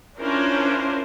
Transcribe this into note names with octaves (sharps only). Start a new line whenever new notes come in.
C#4 D4 E4 F4 A#4 C5